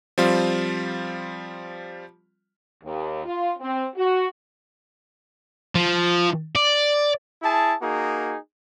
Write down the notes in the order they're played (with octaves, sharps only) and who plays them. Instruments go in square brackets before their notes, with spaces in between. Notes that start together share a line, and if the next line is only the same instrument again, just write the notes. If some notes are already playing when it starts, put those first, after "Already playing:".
[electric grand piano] F3 G3 C4 F4
[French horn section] D#2
F4
C4
F#4
[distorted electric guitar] F3
D5
[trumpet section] E4 G#4 A5
A#3 D#4 F#4 G#4